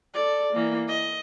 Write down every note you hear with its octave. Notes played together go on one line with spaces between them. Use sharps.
A4 D5
E3 A#3
D#5